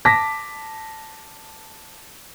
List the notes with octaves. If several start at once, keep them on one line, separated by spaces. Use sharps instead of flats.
A5 D6 A#6 B6